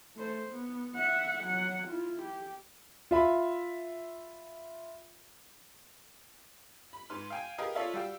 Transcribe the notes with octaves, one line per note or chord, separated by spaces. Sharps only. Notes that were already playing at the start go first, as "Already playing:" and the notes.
A3 C5
B3
E5 F#5
F#3 F#5
E4 F4
G4
F4 E5 B5
B5
G#2 B4 C6 F6
F5 G5 G#5
G4 G#4 A#4 B4 D#5 F5
F4 A4 C#5 D5 E5 F5
G3 F#4 F5 G5 E6